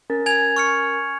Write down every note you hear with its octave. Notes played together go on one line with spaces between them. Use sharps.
C#4 A#4 A6
G#5 G#6 F7
C#6 F6 C#7